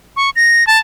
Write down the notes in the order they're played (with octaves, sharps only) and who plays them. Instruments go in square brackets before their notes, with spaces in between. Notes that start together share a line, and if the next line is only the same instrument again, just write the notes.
[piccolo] C#6
A#6
A5